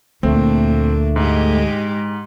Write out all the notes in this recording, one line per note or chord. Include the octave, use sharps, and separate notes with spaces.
D2 A#2 A3 A#3 C4 D4
G#2 G#3 G4